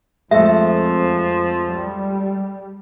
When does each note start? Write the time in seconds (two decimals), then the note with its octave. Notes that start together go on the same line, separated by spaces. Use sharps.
0.31 F2 F3 G#3 A3 A4 E5
1.68 G3